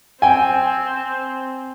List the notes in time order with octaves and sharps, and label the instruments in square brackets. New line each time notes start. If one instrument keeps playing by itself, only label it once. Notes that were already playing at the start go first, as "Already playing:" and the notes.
[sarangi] C4 [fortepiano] G5 G#5